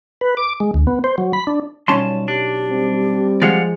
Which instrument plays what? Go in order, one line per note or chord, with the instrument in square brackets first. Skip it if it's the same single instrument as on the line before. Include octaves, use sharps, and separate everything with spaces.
[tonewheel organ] B4
D6
G#3
D2
B3
C5
F#3
B5
D4
[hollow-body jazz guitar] B1 C#4 C6 [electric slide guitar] G3 F4 A5
[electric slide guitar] D4 [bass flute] G4
[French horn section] G3 C4
[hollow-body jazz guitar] F3 G#3 [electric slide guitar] D5 F5 F#5